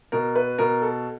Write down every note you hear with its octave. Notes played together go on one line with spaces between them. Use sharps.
B2 A#4
B4
B2 A#4
A4